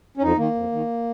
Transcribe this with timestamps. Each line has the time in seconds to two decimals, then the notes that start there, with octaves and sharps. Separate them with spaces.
0.17 C#4
0.22 F2 D#4
0.38 D#3 A#3
0.55 F2
0.72 D#3